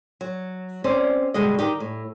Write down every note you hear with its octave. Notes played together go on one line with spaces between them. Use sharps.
F#3
C4 C#4 C5 D5
G2 B2 D3 G#3 F#4 D#5
D#3 D#4 G4
A2